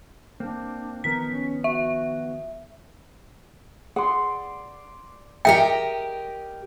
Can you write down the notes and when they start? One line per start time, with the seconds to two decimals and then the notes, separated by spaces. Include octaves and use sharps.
0.40 A#3 C4 D4
1.04 D#3 F3 B3 A#4 B6
1.29 C#4
1.64 F#4 E5
3.96 G#4 D5 F#5 C6
5.45 G4 G#4 A#4 D#5 E5 G5